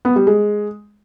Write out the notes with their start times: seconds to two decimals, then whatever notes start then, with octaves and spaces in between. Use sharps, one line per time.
0.05 B3
0.16 G3
0.27 G#3